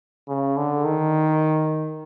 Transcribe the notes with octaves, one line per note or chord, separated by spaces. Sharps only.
C#3
D3
D#3